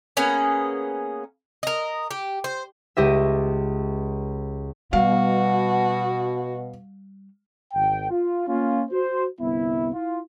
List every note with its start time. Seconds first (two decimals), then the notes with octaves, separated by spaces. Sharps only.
0.17 A#3 B3 C#4 G#4
1.63 A#4 D#5
2.11 G4
2.44 C5
2.97 C#2 G4 D#5 E5
4.93 B2 G3 F#4 F5
7.74 G#1 G5
8.11 F4
8.48 A#3 C#4 F4
8.91 F#4 C5
9.41 G1 C2 B3 E4
9.94 E4 F4